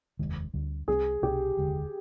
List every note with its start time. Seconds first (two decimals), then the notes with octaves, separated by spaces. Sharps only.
0.19 F1 D#2 D#3 G#3
0.54 D2 D3 G3
0.88 C2 C3 G3 C4 G#4
1.22 C2 B2 B3 D4 G4
1.57 F1 D#2 D3 G#3